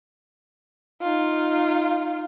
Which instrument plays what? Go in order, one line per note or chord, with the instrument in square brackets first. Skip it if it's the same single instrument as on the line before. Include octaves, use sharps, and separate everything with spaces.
[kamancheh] D#4 F4